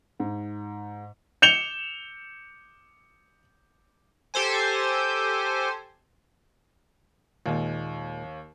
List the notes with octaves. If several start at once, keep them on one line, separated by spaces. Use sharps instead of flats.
G#2
G6 C#7 E7 F7 G7
G4 A4 C5 G#5
D#2 A#2 G#3